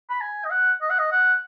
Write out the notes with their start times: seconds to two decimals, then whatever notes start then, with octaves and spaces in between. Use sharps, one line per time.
0.10 B5
0.21 G#5
0.45 D#5
0.50 F#5
0.82 D#5
0.90 F#5
0.99 D#5
1.12 F#5